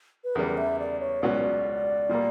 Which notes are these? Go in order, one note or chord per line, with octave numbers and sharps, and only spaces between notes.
B4
E2 C#3 G3 A#4
E5
D5
C#5
C#2 B2 F#3 C#4 F#4 D5
A#2 G3 A#3